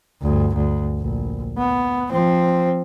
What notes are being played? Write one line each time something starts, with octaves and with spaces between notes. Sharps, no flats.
D2 G2
D2
A#1
B3
F3 C4